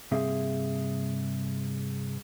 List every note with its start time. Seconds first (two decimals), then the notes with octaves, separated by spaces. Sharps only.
0.11 G2 C3 A#3 C4 G#4 E5